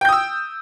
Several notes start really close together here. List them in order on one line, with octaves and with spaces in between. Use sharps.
G5 G6 D#6 E6